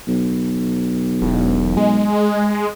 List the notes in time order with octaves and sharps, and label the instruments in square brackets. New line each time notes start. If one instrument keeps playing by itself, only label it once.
[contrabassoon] B1
[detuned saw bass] E1
G#3